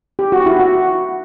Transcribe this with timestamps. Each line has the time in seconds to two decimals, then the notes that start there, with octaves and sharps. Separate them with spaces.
0.19 G4
0.32 F#4
0.46 E4
0.59 F#4